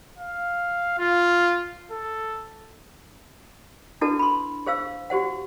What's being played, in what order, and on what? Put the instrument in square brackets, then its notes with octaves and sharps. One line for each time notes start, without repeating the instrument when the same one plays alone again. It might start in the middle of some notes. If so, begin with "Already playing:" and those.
[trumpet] F5
F4
A4
[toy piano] D4 E4 F#4 A4 B4 A5
B5 C6
G#4 C5 F5 E6
F#4 G4 C5 F#5